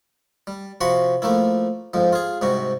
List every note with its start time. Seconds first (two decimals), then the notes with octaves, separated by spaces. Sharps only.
0.47 G3
0.81 C3 F3 F#4 F#5 B5 C6
1.22 F3 A3 A#3 E4
1.94 F2 G#2 F3
2.13 F4 G#4
2.41 G#2 C3 G3 F#4